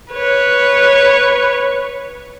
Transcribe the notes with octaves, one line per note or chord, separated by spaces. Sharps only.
B4 C#5